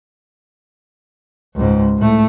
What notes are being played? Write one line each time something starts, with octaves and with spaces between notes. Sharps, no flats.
C#2 G#2
A2 A3